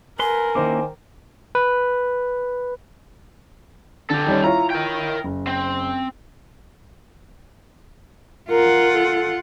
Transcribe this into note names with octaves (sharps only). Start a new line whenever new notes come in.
A#4 B4 G#5 C6
D#3 A#3 C#4 E4 C5 D6
B4
D3 G4 A4
D#3 G3 C#4
E4 F4 C#5 A#5
A#4 G5
F#1
C4
F4 A#4 F#5
A4